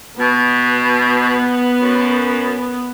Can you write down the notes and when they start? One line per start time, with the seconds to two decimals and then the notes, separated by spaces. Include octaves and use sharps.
0.20 B2 B3
1.79 F#2